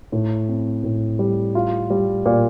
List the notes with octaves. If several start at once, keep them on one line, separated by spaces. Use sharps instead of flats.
A2
C4
A2
G3
F4
G3
A#2